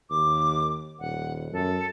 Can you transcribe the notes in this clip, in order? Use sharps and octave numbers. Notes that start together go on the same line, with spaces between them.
D#2 D6
D#1 F#5
F#2 A4